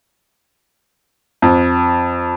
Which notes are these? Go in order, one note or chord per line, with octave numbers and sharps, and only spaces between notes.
F2